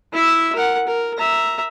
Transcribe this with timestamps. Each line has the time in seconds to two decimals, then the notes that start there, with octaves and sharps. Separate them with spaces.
0.13 E4 E5
0.55 A#4 F#5
0.87 A#4
1.17 E5 A#5